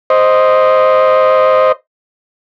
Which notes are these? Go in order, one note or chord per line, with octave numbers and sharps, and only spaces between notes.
C5 D#5